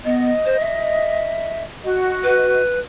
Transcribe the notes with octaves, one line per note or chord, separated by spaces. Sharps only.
B3 D#5
C5
E5
F#4 D#5
B4